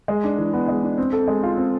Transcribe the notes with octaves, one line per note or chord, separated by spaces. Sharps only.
G#3
D4
E3
B3
G#3
D4
C4
A4
G#3
F4
C4